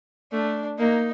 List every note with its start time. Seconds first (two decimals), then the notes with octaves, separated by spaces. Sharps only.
0.32 A3 D4
0.79 A#3 D#4